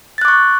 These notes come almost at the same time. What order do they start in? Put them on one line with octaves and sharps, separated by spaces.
A6 F#6 D6 C#6